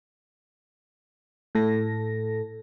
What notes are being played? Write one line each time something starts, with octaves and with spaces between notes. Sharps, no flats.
A2 A4 A#6